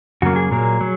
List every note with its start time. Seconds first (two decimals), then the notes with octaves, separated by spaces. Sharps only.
0.22 F#2 C#3 F#3 A#3 F#4
0.36 G#4
0.51 A#2 F#3 A#3
0.81 F#3